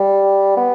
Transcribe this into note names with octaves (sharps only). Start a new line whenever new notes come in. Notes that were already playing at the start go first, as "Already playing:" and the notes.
Already playing: G3
B3